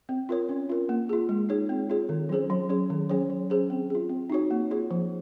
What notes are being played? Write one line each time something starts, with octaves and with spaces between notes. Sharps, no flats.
C4
F4 A#4 C#5
C#4
F4 A#4
A#3
F4 G#4
G#3
D#4 G#4 C#5
C4
F4 G#4 C#5
D#3
F#3 C#4 G#4 C5
F#3
C#4 G#4 C#5
D#3
F#3 C#4 G#4 C#5
F#3
C#4 G#4 C5
C4
F4 G#4
C4
D#4 F#4 C#5
A#3
F4 G#4 C#5
F3